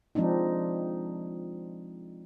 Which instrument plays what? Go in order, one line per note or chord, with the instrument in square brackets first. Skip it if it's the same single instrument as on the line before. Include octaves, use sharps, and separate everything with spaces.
[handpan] F3 G#3 C4 D4 D#4